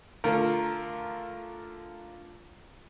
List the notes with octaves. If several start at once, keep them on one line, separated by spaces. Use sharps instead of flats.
D3 A3 F4 A#4